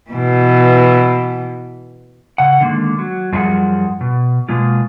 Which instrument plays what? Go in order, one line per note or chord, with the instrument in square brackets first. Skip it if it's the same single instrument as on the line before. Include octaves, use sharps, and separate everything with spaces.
[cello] B2 E3
[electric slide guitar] C#3 F#5
D3 D#3 G#3 A#3
F#3
F#2 F3 G3 D4 G#4 F#5
B2
B2 G#3 A#3 F4